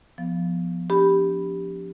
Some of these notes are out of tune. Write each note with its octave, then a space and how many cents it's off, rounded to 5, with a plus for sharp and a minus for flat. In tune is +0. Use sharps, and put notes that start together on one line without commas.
F3 +0 B3 +0
D4 -35 G4 +0 B5 +0